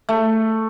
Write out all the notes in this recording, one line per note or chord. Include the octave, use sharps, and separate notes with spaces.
A3